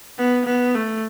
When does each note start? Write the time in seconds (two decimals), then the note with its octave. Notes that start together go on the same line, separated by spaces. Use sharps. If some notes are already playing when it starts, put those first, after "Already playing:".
0.18 B3
0.45 B3
0.75 A3